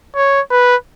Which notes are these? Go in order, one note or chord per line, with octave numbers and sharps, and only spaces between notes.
C#5
B4